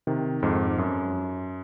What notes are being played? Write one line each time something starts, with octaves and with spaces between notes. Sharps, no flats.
C3 D#3
F2 G#2
F#2